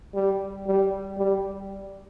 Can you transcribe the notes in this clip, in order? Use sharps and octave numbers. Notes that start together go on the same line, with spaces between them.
G3
G3
G3